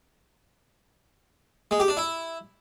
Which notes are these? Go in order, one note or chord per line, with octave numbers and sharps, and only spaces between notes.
G#3
G4
D4
E4